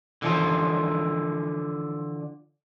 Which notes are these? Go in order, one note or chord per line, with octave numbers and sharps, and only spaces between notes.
D3 E3 F3